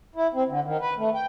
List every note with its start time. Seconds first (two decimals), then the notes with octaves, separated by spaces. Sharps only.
0.15 E4
0.34 C4
0.49 D3
0.64 D#3
0.81 B4
0.97 A3
1.14 G5